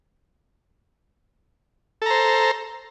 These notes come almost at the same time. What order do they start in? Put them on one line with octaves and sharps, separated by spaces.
A4 A#5 C5